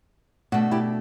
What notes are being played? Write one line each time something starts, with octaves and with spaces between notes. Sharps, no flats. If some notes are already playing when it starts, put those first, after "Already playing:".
B2 A3 D4 F#4
E4 G4